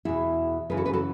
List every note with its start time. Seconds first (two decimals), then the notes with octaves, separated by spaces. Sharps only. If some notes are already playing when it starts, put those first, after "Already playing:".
0.05 E2 B2 E4 G#4
0.70 F#2 C#3 E3 G#4 B4
0.77 F#4 A4
0.86 G#4 B4
0.93 F#4 A4